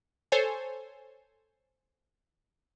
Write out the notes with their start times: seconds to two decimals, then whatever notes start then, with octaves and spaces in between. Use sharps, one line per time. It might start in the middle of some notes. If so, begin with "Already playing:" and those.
0.32 A4 C5 C#5 G#5